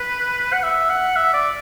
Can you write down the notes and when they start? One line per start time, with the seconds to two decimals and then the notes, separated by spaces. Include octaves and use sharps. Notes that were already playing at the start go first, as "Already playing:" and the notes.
Already playing: B4
0.53 F#5
0.63 E5
0.90 F#5
1.16 E5
1.33 D5